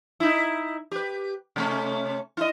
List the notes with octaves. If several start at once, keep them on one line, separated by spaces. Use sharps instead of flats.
D#4 E4
G4 B4
C3 A3 C#4
E4 D#5